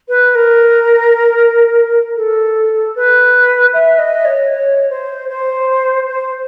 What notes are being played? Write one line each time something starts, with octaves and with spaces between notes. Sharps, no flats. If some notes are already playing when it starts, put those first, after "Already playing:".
B4
A#4
A4
B4
E5
D#5
C#5
C#5
C5
C5
C5